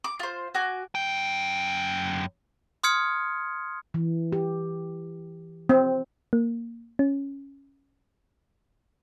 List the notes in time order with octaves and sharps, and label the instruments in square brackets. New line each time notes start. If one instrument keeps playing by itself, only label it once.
[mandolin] D6
F4 C5
F#4 G#5 D6
[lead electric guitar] F#2 G5
[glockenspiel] C6 D#6 F6 G#6 C#7
[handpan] E3
G4
[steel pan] C4
[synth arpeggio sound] A#3
C#4